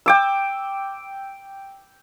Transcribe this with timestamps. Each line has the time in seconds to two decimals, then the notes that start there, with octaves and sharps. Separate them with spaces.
0.06 G5 D6 E6